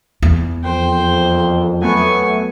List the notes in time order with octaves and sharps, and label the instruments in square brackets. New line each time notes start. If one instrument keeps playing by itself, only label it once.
[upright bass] E2
[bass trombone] F2 [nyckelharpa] C5 G5
[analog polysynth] F#3 A3 B3 [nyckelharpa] G#5 C#6